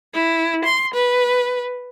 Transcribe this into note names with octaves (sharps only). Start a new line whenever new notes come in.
E4
C6
B4